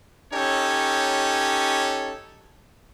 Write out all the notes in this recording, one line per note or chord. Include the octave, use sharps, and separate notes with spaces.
C#4 D#4 G4 A4 C#5